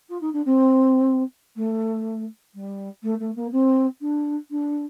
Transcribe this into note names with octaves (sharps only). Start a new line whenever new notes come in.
F4
D#4
D4
C4
A3
G3
A3
A3
A#3
C4
D4
D4